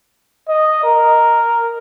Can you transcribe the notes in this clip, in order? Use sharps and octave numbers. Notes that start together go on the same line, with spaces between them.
D#5
A#4